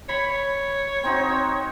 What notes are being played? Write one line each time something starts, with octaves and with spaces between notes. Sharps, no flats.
C#5 B5
C4 D#4 F#4